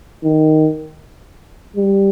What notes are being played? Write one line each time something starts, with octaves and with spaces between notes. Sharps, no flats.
D#3
G3